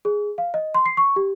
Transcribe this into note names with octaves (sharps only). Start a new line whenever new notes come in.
G#4
F5
D#5
C6
C7
C#6
G4